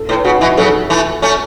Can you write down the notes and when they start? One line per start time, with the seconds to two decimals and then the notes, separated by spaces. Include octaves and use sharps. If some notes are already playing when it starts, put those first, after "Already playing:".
Already playing: A4
0.09 A2 B4
0.24 C#3 F#4
0.41 B2 E3 E4
0.57 C#3 F#3 A4
0.90 E3 A3
1.22 A3 C#4